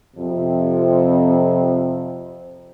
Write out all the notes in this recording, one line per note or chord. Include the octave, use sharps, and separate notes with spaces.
F2 C3